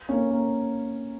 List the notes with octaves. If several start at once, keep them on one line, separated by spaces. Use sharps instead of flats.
A#3 C#4
A#3